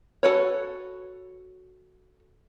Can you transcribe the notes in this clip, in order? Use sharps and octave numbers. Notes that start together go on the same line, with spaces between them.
F#4 A4 B4 C#5